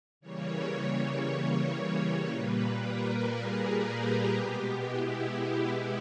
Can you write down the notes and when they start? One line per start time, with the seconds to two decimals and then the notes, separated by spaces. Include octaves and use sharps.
0.21 C#3 E3 G3 A#3 C#5
2.27 A#2 G3 A#3 B4
2.78 A#4
3.30 G#4
3.82 G4
4.33 B2 G#3 B3
4.85 E4